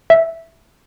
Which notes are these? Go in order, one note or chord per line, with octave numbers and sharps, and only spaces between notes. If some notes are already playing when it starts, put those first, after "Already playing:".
E5